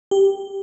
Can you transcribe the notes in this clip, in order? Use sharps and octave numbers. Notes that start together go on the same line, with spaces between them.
G4